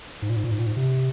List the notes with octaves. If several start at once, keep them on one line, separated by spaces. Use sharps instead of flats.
G#2
A#2
G#2
A#2
G#2
A#2
G#2
C3